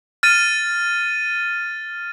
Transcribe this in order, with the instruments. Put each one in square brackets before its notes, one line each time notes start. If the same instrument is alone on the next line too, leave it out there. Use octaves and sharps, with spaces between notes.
[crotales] F6 A6 D#7